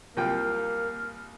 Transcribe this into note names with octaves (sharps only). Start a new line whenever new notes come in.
C2 A#3 F4 F5 G5